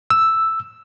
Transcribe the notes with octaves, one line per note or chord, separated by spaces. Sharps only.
E6